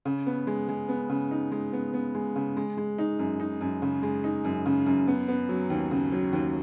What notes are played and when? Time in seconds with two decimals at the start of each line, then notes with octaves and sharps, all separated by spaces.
0.05 C#3
0.26 B3
0.47 G#3
0.69 G#3
0.89 B3
1.10 C#3
1.31 D#4
1.52 G#3
1.73 B3
1.93 B3
2.15 G#3
2.36 C#3
2.57 G#3
2.77 G#3
2.98 D#4
3.19 F#2
3.40 D#4
3.61 F#2
3.82 C#3
4.03 G#3
4.24 D#4
4.45 F#2
4.66 C#3
4.86 F#2
5.07 B3
5.28 B3
5.49 F#3
5.70 D#2
5.91 C#3
6.12 F#3
6.33 D#2